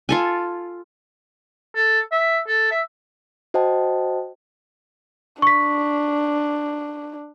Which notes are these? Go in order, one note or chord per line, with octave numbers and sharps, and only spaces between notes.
F4 A4 G#5
A4
E5
A4
E5
F#4 C5 D#5 G5 A5
D4 C#6 B6